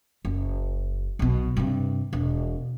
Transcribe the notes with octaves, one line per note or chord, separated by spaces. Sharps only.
F#1
B1 B2
G2 C3
E1